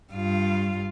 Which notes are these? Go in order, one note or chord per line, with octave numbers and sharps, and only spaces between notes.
G2 F4